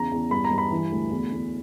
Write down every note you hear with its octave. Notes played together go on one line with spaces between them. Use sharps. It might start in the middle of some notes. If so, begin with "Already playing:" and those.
Already playing: E2 C#3 A#5
E2
G2 B5
A#5
G2
B5
E3
D2
E2
E2